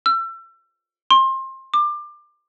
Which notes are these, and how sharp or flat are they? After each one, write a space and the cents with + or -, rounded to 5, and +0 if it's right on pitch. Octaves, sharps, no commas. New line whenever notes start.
E6 +35
C6 +25
D6 +25